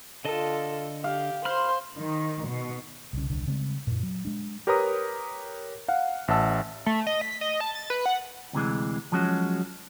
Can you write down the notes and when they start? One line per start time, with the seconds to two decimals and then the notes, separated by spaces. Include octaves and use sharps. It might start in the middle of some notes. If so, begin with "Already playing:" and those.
0.25 D3 F4 A4 D#5 A5
1.04 G4 F5
1.45 C5 B5 C6 F6
1.97 D#3
2.46 B2
3.13 C2 C#3
3.30 D#1 C2 D3
3.47 C#3 G3 G#3 C4
3.87 F#2 A#2
4.03 F#3
4.25 G#3 D4
4.67 G4 A#4 B4 C#5 A#5 D#6
5.88 F5 F#5
6.28 A1 E5 F#5 A5 E6
6.86 A3
7.07 D#5
7.21 B6
7.41 D#5
7.60 A5
7.75 A6
7.90 B4
8.06 F#5
8.53 D2 C3 E3 G#3
9.12 F3 F#3 G#3 C#4 F#4